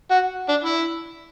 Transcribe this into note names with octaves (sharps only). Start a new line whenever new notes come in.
F#4
D4
E4